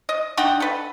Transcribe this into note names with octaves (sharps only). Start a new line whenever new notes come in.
D#5
D4 D#4 F#5 G5
A4 B4